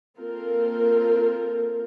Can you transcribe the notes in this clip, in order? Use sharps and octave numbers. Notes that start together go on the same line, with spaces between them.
A#3 C4 F4 A4 A#4